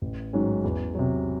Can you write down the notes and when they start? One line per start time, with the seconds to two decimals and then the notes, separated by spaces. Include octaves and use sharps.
0.01 A1
0.33 G#2 D#3 F#3 C#4
0.64 E2
0.95 C3 F#3